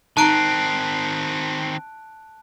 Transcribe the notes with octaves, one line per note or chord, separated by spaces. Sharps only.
D#3 C4 D#4 A5 A#5 F#6 D7